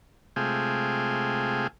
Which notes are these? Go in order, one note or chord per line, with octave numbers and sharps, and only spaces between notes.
C3 G#3 A3 F4 G#4 G5